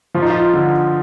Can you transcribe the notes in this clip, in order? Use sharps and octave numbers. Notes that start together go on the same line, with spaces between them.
F3 F4
D#4
F4
D3